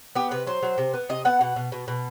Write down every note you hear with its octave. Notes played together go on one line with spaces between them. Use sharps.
B3 G4
C3 B4
F#3 C5
F#3
C3
B3
C3 D#5
B3 F#5
B2
B2
B2
B2